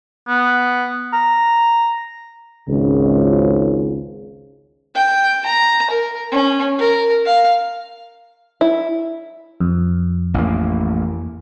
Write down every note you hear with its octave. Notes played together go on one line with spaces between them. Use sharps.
B3
A#5
G#1 C#2
G5
A#5
A#4
C#4
A#4
F5
E4
F2
A1 A#3